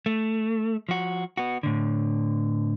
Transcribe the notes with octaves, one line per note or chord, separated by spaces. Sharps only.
A3
F3 F#4
B3 F#4
A2 D3